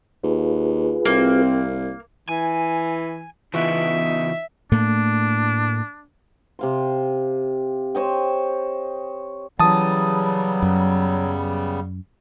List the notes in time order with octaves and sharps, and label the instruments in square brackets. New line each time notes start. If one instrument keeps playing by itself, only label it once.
[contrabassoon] D#2 [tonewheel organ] F4 G#4 B4
[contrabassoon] C2 [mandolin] A#3 [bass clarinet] C4
[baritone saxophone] E3 [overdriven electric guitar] G#5
[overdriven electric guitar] C#3 B3 [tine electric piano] E3 F4 C#6 [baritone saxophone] D#4 [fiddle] E5
[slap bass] A2 A3 A#3 [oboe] D4
[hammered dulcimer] C3 F5 C6
C5 C#5 D#5 G5
[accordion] C#3 G3 B3 [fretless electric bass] E3 [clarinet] F#3 [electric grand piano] A5 D#6
[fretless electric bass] F#2